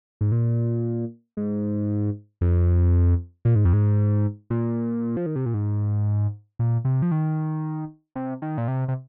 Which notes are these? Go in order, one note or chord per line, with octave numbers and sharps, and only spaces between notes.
G#2
A#2
G#2
F2
A#2
G#2
F2
G#2
A#2
F3
D#3
C3
A#2
G#2
A#2
C3
F3
D#3
C3
D#3
A#2
C3
C3